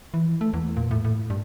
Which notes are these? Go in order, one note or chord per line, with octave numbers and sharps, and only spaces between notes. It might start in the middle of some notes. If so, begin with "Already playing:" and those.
E3
A3
E2
A#2
A2
A2
G2